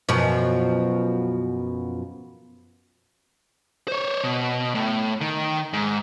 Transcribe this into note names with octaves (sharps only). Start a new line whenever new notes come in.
F#2 B2 F3
C5 C#5
B2
A2
D#3
G#2